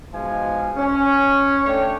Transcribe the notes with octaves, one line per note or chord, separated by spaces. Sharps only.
G#2 B2 F3 G#3 F5 G#5
C#4
A3 D4 C#5 G5